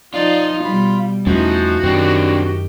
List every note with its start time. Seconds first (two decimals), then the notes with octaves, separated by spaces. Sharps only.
0.14 F3 D#4 F4 D5
0.64 B2 G3 B5
1.27 E2 E3 F3 A3 C#4 D#4 F#4
1.83 F#2 D#3 C4 D4 G4